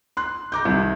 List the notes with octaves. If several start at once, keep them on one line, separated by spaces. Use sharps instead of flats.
C6 F#6
A#5 D6 G6
C2 D#3